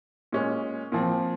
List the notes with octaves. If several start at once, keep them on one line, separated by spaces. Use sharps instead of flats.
A#2 G#3 C#4
A#2 F3 C4